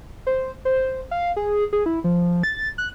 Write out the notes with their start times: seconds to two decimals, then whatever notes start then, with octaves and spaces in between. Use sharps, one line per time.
0.27 C5
0.65 C5
1.11 F5
1.36 G#4
1.73 G#4
1.86 E4
2.04 F3
2.43 A6
2.78 F#6